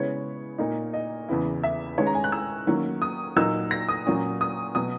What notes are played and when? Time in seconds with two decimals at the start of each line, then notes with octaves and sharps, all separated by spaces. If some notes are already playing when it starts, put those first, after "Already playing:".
Already playing: C#3 G#3 B3 E4 C#5
0.58 A#2 A#3 D#4
0.93 D#5
1.29 E2 C#3 E3 B3 E4
1.63 E5
1.98 D#3 G#3 C#4 C#5
2.07 A#5
2.15 G#5
2.24 F#6
2.32 E6
2.67 D#3 F#3 A#3 C#4
3.02 D#6
3.36 A#2 F#3 A#3 D#4 E6
3.71 A#6
3.89 D#6
4.07 A#2 F#3 A#3 C#4
4.41 D#6
4.75 B2 F#3 D#6